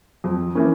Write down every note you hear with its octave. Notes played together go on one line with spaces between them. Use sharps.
F2
E3 A#3 C#4